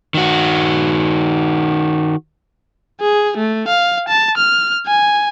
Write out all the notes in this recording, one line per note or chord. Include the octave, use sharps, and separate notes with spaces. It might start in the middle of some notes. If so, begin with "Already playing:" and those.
D#3 F#4
G#4
A3
F5
A5
F6
G#5